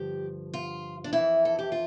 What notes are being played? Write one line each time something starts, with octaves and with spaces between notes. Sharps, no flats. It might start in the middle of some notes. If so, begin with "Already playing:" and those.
Already playing: G2 D3 F3 G4
F4
D4
F2 E3 E4
A4
G4
F4